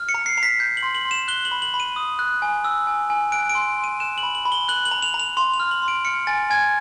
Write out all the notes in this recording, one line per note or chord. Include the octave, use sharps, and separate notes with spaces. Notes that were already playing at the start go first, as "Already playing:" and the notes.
Already playing: F6
C#7
A#5
C7
A#5 C7
B6
G6
F#7
C6
F#7
C6
E7
F#6 G7
F#7
B5
F#7
B5
D#7
D#6
F#6
G#5
E6
G#5
G#5
F#6 D7
D7
C6
C6
D#7
F#6 E7
F#7
B5
F#7
B5
G7
F#6 F#7
F#7
A#5
F7
A#5
F7
C6 F7
F7
F6
F#7
C6
D7
F6 C#7
G#5 A6
G#5 G#6